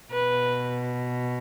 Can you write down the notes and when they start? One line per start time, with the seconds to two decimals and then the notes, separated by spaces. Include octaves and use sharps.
0.11 B2 B4